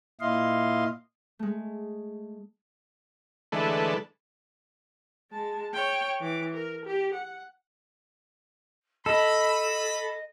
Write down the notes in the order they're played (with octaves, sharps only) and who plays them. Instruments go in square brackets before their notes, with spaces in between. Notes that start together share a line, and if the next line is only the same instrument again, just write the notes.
[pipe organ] A#2 E4 D#5 F5 C6
[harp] G#3 A3
[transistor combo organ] D3 E3 G#3 A3 A4 B4
[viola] G#3 A5
C#5 G5
E3 D6
A#4
G4
F#5
[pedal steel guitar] A4 [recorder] D#5 [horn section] B5